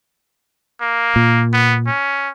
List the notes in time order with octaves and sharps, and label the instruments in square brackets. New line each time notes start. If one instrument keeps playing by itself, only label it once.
[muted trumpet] A#3
[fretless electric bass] A#2
[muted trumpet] B3
C#4